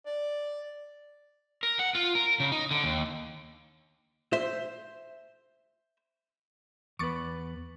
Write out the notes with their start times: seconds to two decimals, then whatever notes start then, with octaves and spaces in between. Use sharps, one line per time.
0.06 D5
1.63 A#4
1.79 F#5
1.95 F4
2.15 A#4
2.40 C#3
2.52 D#4
2.71 D3
2.84 D#2
4.33 C5 E5
6.99 E2 B3 B4 C#6 D6 A6